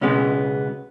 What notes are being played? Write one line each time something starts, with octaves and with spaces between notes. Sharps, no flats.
C#2 B2 G#3 B3 C#4